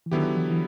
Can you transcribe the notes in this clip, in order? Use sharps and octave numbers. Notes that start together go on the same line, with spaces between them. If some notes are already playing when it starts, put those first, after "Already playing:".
E3
D3 D#3 F#3 B3 E4 G4
E3
E3